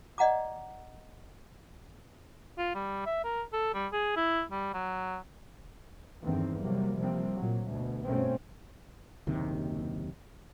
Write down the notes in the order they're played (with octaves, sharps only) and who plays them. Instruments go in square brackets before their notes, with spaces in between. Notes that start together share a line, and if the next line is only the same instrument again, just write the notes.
[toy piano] D5 D#5 F#5 A#5 D6
[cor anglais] F4
G3
E5
A#4
A4
G3
G#4
E4
G3
F#3
[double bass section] E2 G2 D3 D#3 C4
C3 F#3 G3 A#3
C3 F3 G3 A#3 C4
A#2 F#3
D2 B2
G2 B2 A3 C4 C#4
[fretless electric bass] F#1 D#2 C3 D#3